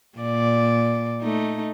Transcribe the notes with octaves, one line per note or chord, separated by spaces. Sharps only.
A#2 D5
A3 D#4